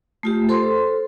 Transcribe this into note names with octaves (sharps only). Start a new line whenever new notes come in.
A3 F4 G4
A4 C5 C6